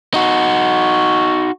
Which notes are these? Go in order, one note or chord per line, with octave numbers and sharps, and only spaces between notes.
D#4 F#4